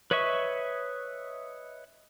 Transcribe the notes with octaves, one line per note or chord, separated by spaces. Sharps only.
B4 C#5 D#5 E5 C#6